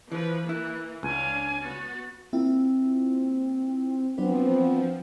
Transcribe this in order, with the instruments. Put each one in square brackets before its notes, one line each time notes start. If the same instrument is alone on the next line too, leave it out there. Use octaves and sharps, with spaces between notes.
[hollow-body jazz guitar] E3 [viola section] F3 B4
[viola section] E3 A#3 [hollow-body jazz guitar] E4 [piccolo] F#6
[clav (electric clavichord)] C#2 [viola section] C#4 D4 F5 [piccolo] G#5
[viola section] B3 F#4 [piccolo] A6
[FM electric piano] A#3 E4 F4 [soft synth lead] C4
[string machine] F3 [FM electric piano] F#3 D4 B4 [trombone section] B3 C4